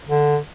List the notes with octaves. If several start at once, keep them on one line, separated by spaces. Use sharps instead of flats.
D3